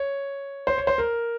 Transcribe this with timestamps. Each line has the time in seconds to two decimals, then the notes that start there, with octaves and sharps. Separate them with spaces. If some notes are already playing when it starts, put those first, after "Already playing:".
Already playing: C#5
0.67 C5
0.78 C#5
0.87 C5
0.98 A#4